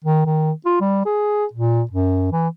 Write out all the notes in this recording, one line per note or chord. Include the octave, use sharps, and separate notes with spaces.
D#3
D#3
F4
G3
G#4
A#2
F#2
E3